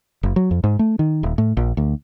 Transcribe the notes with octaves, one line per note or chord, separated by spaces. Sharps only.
F#1
F#3
F2
G#2
A3
D#3
D#1
A2
A#1
D2